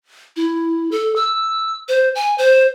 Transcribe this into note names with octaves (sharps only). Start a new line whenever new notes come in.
E4
A4
E6
C5
G#5
C5